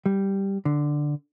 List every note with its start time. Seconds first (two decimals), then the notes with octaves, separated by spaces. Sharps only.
0.06 G3
0.65 D3